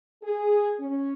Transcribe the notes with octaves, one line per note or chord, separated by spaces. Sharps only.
G#4
C#4